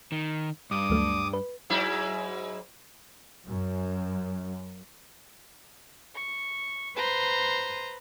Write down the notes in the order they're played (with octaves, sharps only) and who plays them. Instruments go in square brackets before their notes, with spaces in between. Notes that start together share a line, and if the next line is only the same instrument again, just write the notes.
[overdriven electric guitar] D#3
[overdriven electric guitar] G2 [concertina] D6 D#6
[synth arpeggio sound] D2 F#3 A3
B4
[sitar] G#2 F#3 E4
[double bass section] F#2
[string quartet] C#6
B4 C5 A#5 C6